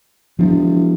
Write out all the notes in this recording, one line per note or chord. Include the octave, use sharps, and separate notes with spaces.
E1 F3 D4